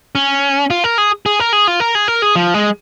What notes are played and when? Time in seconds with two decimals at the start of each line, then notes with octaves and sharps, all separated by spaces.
0.15 C#4
0.70 F4
0.84 A#4
0.98 G#4
1.26 G#4
1.40 A#4
1.53 G#4
1.67 F4
1.80 A#4
1.95 G#4
2.08 A#4
2.22 G#4
2.36 F3
2.54 G#3